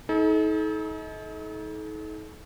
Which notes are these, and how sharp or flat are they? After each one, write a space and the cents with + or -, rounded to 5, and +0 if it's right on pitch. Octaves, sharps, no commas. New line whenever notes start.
D#4 +35 A4 -40